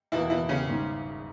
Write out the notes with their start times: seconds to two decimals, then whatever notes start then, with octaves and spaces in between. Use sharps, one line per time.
0.12 E2 B2 E3 A#3 E4
0.30 E3 E4
0.49 C#3 C#4
0.67 G#1 G#2 G3